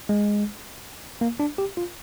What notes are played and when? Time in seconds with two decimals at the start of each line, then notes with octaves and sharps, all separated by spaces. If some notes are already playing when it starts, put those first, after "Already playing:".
0.09 G#3
1.21 A#3
1.40 D4
1.58 G4
1.77 F4